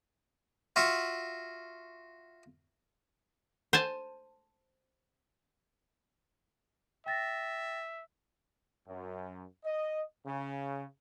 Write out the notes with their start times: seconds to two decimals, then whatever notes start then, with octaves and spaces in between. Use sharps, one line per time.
0.76 F4 F#4 E5 F#5
3.73 C5 G#5 A5
7.06 E5 G5 A6 A#6
8.88 F#2
9.64 D#5
10.26 C#3